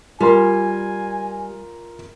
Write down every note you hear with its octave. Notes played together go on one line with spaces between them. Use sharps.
G3 F4 A#4 G#5 C6